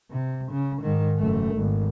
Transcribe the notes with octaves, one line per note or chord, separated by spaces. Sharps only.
C3
C#3
G#2 D#3
F#1 A3
G#1